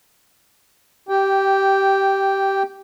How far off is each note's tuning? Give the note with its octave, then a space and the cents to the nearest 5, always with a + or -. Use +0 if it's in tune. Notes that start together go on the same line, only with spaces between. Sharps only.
G4 -15 G5 +0